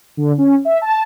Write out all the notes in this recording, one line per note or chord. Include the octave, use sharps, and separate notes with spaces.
D3
C#4
E5
A5